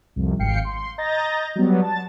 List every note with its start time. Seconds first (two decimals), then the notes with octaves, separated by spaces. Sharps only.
0.16 C2 F2
0.39 G#1 F5 G5 C7 C#7
0.65 C6
0.98 D#5 A#5 G6 A6 A#6
1.56 F#3 G3 B3
1.82 A5 A6